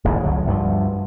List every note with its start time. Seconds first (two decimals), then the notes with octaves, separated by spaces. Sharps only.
0.04 D1 A1 D#2 G#2
0.23 C#2 D3 F#3
0.45 D2 G2 F3